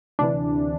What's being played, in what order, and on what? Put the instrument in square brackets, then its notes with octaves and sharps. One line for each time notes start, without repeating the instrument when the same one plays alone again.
[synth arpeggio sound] D2 C3 E3 D4